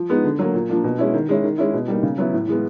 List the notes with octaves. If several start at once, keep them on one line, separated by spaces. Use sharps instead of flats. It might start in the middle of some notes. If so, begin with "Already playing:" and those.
Already playing: F3
G#3 B3 D#4
D3
F#3 A#3
A#2
F3 A#3 D4
B2
G#3 C#4 E4
D#3
G#3 C#4 E4
D#3
G#3 C#4 E4
B2
G3 A#3 D#4
C#3
F#3 B3 E4
A2
E3 G#3 B3